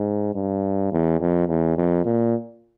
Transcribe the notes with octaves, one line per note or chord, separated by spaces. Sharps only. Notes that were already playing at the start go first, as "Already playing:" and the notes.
Already playing: G#2
G2
E2
F2
E2
F2
A#2